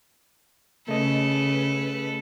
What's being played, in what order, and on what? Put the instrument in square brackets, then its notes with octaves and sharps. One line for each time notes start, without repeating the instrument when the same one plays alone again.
[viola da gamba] C#3 [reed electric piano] A3 D#5 [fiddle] A4 B4